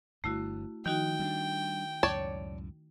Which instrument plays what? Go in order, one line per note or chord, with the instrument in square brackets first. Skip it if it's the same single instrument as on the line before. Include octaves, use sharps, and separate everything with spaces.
[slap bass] G1 G2 [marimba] A3 E4 F#4
[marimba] D#3 D#4 F#4 [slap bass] F3 [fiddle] G5
[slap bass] G3 B3 D4
[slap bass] C#2 F#2 A2 [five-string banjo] C#5 D5 A5